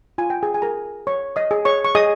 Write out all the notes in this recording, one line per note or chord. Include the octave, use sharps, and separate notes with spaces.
F4 G#5
G5
G#4 G#5
G#5
G#4 A#4 A#5
C#5 C#6
D#5 D#6
G#4
C#5 C#6
C#6
G#4 D#5 D#6